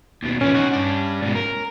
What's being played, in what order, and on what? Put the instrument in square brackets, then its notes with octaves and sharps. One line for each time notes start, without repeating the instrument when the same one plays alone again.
[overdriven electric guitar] D#2 B2
[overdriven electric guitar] A#2 E3 [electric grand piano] C#4
[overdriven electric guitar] D#4 F#4
G2 D4
G#2 B2
A#4